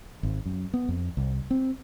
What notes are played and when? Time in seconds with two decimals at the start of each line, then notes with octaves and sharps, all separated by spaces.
0.23 G#1
0.45 F#2
0.74 B3
0.88 F2
1.17 C2
1.51 C4